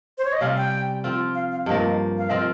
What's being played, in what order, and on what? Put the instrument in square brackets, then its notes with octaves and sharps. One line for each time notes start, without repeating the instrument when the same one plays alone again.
[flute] C5
C#5
D#5
[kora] C3 G3 C#4 [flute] F5
[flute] G5
[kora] F3 C4 F4
[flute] F5
F5
[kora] G2 F3 A#3 [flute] D#5
[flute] F5
[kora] F3 C4 F4 [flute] D#5